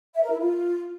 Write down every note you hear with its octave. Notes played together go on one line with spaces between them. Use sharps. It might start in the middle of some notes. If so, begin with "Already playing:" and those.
E5
A#4
E4
F4